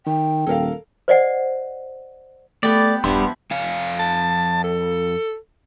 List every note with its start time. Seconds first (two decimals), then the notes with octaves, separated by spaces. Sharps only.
0.06 D#3 G5
0.47 D#1 A4 A#4 F5
1.08 C5 D5 D#5 F#5
2.63 A3 B3 G4 D5
3.04 D#1 G2 F3 G3 B3 E4 C6
3.51 F2 F5 G#5
3.99 A5
4.64 A4